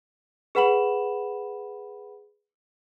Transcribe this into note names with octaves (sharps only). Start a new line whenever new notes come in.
G#4 B4 F#5 B5 E7 F#7